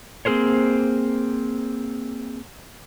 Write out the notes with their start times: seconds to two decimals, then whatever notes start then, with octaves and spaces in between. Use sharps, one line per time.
0.25 A#3 C4 G#4 A#4 C5 C#5